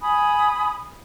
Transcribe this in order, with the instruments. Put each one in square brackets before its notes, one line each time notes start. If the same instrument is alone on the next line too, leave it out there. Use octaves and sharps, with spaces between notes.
[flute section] G#5 B5 D#6